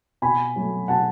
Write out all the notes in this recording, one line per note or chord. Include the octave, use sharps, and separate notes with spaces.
B2 G#5 B5
F#3 A3
B2 F#5 A5